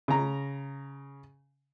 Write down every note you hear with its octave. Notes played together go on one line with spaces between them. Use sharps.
C#3 A#5